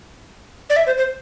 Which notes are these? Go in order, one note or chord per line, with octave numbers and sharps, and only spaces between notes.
D5
E5
C5
C5